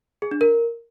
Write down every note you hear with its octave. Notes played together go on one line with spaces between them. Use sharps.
G#4
D4
A#4